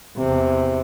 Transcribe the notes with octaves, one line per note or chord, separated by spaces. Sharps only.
E2 C3